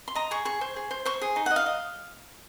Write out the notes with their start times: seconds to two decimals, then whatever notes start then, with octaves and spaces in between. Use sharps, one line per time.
0.08 C6
0.15 D#5 A#5
0.31 G#4 C#6
0.45 G#4 C#6
0.61 C5
0.76 G#4
0.91 C5
1.05 C5 C#6
1.21 G#4
1.36 D#4
1.46 F#5
1.51 D#5
1.56 F5
1.66 D#5